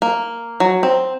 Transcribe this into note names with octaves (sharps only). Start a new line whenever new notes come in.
A#3
F#3
C4